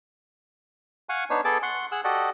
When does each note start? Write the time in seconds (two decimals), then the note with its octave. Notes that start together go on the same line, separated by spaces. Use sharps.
1.09 F5 F#5 G#5 C#6
1.30 B3 D4 D#4 C#5
1.45 B3 G#4 A4 A5 D6
1.63 F#5 C6 C#6
1.92 G#4 F#5 E6 F#6
2.04 F#4 G4 A4 D5 D#5 F#5